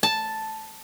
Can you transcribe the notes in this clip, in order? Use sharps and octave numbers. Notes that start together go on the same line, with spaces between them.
A5